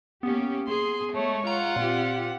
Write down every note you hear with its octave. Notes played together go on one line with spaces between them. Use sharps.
A#3 B3 C#4 G4
G#4 C6
G#3 A3 C#5
F4 F#5 A#5
A#2 C4 G4